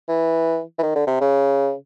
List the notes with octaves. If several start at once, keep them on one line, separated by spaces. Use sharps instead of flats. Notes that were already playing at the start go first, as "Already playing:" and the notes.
E3
E3
D#3
D3
C3
C#3